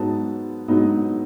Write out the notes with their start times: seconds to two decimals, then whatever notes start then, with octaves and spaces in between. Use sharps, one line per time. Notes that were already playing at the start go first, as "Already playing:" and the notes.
Already playing: G#2 F#3 B3 D#4 A5
0.68 G#2 F#3 B3 D#4